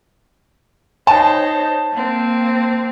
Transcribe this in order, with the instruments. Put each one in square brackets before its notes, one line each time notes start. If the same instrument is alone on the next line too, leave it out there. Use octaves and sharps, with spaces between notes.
[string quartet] D#4 C5 C#5 [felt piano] A5
[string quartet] A#3 C4